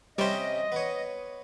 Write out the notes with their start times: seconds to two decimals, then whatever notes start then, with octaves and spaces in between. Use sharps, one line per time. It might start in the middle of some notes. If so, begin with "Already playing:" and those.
0.18 C3 G3 C#4 C5 D#5 G5
0.72 B3 C#5